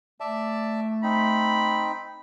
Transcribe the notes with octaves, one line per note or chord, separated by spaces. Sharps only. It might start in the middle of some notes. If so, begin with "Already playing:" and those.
A3 D5 E5 A5
C4 D#4 B5